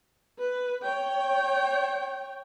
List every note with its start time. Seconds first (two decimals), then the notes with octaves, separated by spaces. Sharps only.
0.38 B4
0.82 C#5 G5